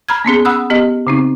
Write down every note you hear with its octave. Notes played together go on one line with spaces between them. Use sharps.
A#5 B5 F6 G#6
A#3 B3 C#4 G#4
F#5 B5 D#6 E6 F#6
B3 G4 D#5
C#3 C4 D#4